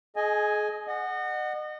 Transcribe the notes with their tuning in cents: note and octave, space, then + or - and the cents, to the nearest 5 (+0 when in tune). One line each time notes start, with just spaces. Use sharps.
G#4 +30 D#5 +0 G#5 +0
D#5 -35 F#5 +0